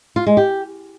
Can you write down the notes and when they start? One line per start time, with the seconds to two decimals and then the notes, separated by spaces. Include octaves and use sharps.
0.16 F4
0.27 G#3
0.37 G4